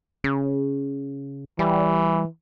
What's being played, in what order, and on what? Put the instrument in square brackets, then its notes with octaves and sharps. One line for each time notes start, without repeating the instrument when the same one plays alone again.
[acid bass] C#3
[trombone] E3 [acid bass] G3